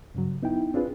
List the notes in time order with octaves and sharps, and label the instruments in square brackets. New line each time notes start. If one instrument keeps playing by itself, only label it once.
[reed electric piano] G2 C#3 F#3
B3 D#4 E4 G5
C4 D4 F4 G#4 B4